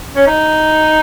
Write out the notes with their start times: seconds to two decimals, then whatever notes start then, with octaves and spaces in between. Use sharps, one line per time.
0.16 C#4
0.27 D#4